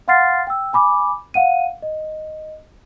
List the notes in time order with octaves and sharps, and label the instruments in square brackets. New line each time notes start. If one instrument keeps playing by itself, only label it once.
[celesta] F5 F#5 C6 F6 A6 C7
G5 E6
G#5 B5 D6
F5 F#5 D#7
D#5